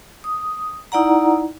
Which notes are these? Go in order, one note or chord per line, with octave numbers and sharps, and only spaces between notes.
D#6
D#4 E4 D5 F#5 A#5